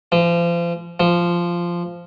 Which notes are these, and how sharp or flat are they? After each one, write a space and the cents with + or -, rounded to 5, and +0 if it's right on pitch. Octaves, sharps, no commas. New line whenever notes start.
F3 -35
F3 -10